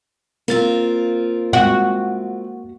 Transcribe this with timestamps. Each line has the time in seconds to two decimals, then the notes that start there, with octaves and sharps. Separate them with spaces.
0.48 A#3 C4 F4 A#4 A6
1.53 G#3 F#4